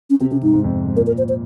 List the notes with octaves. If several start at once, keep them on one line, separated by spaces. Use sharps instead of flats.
C#4
C3 C4
C3 C#4
G#2 D#4
G#2
F2
G#2
A#2 A#4
A#4
C5
C5